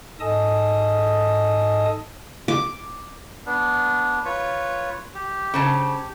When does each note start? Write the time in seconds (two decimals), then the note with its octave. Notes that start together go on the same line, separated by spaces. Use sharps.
0.20 G#2 A4 D#5 G#5 A5 D#6
2.48 D6
3.46 B3 D4
4.25 F4 B4 C#5
5.15 G4
5.54 C#3 C5 A5